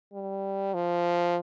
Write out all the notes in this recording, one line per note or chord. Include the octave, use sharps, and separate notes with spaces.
G3
F3